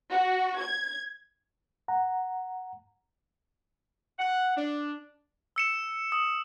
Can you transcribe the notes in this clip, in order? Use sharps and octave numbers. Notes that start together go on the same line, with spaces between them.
F#4
G#6
F#5 A#5
F#5
D4
E6 C#7 E7
D#6